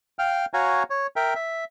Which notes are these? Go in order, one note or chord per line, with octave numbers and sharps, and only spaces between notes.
F5 G5 F6
F#4 C#5 F5 G#5 A#5
C#5
A#4 E5 G5
E5